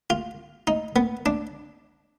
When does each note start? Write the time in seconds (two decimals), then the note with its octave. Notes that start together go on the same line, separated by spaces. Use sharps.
0.10 F4
0.67 D#4
0.96 B3
1.26 D4